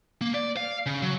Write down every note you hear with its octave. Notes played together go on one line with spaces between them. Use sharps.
A#3
D5
F5
C#3
F#3